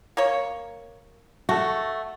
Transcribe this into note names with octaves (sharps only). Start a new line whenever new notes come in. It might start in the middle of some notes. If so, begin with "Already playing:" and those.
A#3 C#5
A3 F#4 A4